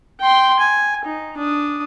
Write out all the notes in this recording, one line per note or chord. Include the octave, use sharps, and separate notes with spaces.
G5 C6
G#5
D#4
D4 D#6